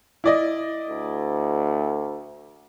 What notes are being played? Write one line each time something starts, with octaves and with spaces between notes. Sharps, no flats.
E4 D5 D#5
D2